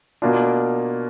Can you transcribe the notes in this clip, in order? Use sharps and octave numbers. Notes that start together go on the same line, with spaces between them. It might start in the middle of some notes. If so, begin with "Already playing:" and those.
B2 A#3 D4 F4